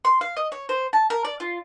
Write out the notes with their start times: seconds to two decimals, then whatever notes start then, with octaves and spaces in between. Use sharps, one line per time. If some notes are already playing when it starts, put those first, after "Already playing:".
0.05 C6
0.21 F5
0.37 D#5
0.52 C#5
0.69 C5
0.93 A5
1.10 A#4
1.25 D5
1.40 F4